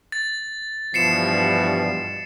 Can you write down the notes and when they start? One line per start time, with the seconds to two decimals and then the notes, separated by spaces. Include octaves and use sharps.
0.12 A6
0.94 G2 B2 E3 F3 C7 C#7 E7